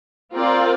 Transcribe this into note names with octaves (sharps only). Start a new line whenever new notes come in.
C4 F4 A#4 D5